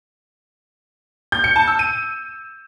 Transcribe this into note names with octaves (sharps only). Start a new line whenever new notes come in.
G6
C#7
A5
E6
D#7